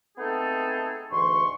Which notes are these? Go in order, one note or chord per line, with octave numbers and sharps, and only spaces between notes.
A3 B3 C4 D#4 G#4 A4
D2 G#2 E3 C6 C#6